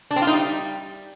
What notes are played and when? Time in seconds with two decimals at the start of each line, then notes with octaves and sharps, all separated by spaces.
0.11 D4
0.16 C4
0.22 F4
0.27 D#4
0.33 G3